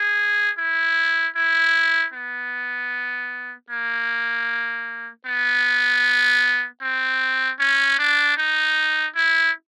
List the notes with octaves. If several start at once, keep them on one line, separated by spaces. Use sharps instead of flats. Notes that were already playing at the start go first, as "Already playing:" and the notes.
Already playing: G#4
E4
E4
B3
A#3
B3
C4
C#4
D4
D#4
E4